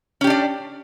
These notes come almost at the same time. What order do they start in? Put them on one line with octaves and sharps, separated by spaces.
C#4 G4 D4 D5